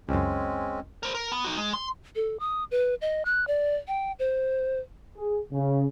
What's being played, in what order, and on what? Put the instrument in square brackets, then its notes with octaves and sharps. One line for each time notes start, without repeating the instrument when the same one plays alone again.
[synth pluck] C#2 F#2 [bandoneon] G#3 C4 C#4
[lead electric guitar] A#4 C5
A#4
B3
D#4 F#4
G#3
C6
[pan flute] A4
D#6
B4
D#5
F#6
D5
G5
C5
[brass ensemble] G#4
C#3